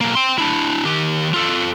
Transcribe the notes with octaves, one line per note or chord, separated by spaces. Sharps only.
B1 A#3
G5 C6
D4 E4
D#3 G4
F4 A4